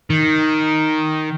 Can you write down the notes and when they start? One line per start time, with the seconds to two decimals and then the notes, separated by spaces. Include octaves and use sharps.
0.10 D#3